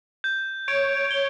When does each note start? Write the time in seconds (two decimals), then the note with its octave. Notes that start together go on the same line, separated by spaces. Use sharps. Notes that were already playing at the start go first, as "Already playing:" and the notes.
0.24 G6
0.68 C#5 D7
1.11 G7